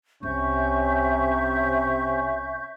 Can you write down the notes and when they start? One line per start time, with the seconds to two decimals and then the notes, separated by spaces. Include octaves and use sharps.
0.23 C2 C3 C#4 E5 C#6 G6